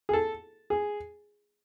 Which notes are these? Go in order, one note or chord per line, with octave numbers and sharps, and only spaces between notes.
G#4
A4
G#4